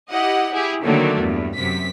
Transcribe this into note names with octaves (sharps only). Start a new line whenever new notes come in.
E4 G4 D#5 F#5
E4 G4 G#4
D3 D#3 F#3 A3 A#3 D4
E2 G2
F#2 C3 B6